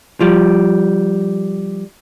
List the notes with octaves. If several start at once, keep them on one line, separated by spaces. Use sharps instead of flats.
F3 G3